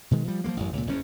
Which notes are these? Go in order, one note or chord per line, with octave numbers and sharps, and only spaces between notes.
B2 D#3 G#3
F3 G3
F3 F#3 G#3 A#3
A1 F#2
C#2 A#2
F#1 E2 C#4